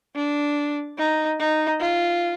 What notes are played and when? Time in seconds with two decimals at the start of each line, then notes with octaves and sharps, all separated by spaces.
0.16 D4
0.98 D#4
1.40 D#4
1.81 F4